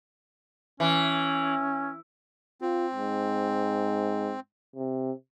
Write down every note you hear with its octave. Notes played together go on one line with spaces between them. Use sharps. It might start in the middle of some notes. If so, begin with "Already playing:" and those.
E3 C#4
C4 F4
G#2
C3